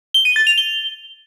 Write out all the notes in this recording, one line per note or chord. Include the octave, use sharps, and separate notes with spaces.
G7
D#7
A6
F7
G7